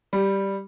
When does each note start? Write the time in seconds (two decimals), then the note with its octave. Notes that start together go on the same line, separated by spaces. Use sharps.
0.13 G3